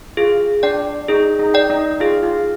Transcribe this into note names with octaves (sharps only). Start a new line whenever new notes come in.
F4 G#4
D4 D5 G5
D#4 G#4
D#4
D5 G5
D#4
F4 G#4
F4